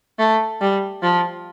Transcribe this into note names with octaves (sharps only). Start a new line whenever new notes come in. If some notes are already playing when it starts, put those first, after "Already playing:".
A3
G3
F3